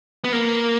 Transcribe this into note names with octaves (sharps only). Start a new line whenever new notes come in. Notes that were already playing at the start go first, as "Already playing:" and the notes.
B3
A#3